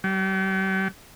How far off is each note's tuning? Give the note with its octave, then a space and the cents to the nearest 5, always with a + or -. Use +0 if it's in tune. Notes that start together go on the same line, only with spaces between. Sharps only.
G3 -45